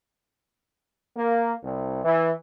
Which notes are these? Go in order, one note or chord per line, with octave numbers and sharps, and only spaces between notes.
A#3
C2
E3